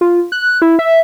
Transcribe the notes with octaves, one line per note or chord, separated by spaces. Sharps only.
F4
F#6
E4
E5